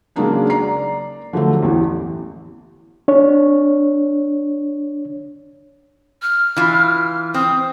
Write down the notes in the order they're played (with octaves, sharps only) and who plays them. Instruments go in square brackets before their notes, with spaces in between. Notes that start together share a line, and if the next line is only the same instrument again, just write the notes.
[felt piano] C#3 F#3 G#3 A#3 D4 D#4
D5 A#5 C7
D3 F3 F#3 A3
A1 E2 E3
[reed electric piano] D4 C#5
[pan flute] F6
[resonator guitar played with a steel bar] E3 F4
[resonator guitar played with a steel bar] C4 [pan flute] D#6